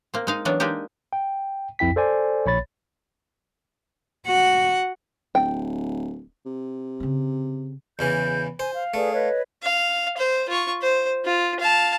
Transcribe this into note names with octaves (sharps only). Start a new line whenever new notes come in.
A#3 C4
G#3 D#4 F5
E3 F#3 B3 C#4 D4
G#3 A#3 D4 D#4 G4
G5
B1 F2 E4 G5 B6
A4 C5 D5 G#5
A#1 C#5 B5 A6
F#4 F#5
D1 G5
C3
C#3 C4
E2 C#3 E3 G6
C5 G#5
F5
A3 G#4 B4 D5
B4 C#5 D#5
F5
C5
F4 C#6
C5
F4
F5 A5